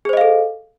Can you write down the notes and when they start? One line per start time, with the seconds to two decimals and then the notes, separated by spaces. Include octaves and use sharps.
0.05 G#4
0.09 C5
0.13 D#5
0.17 F5
0.21 A4